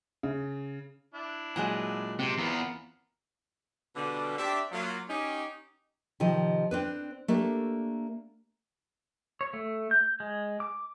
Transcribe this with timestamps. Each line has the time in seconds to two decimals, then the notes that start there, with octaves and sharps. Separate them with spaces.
0.23 C#3
1.14 D4 E4
1.56 A#2 F#3 G#3 G#5
2.19 C3 C4 C7
2.38 E2 B3 F4 A#4
3.95 B2 D3 G3
4.37 C4 D4 G4 D5 E5
4.72 F#3 A#3 F4
5.08 C#4 D#4 G4
6.20 C3 D#3 F3 D#5
6.71 C4 D4 B4
7.28 A3 A#3 D4 G4 A#4
9.41 C#5
9.53 A3
9.91 G6
10.20 G#3
10.60 D6